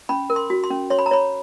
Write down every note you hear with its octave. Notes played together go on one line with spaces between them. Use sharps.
C#4 B5
A#4
C6
F#4
C6
C#4
C#5 C6
B5
A#5
C#5 B5